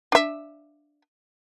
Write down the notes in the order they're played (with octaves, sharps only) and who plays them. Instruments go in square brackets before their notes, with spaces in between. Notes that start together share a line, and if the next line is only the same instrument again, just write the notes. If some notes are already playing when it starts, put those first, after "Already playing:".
[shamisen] D4 E5